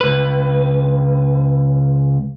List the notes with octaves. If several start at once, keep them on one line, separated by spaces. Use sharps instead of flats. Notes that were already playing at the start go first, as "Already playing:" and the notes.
C#2 B4